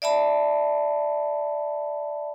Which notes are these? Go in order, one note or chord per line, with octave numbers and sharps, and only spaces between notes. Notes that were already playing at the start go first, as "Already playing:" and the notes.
D5 E5 A5 B5